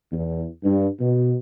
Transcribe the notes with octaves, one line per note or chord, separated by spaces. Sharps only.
E2
G2
B2